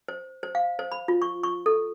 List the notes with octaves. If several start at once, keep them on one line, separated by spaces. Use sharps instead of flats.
C5
C5
F5
C5
B5
F4
C#6
C#6
A4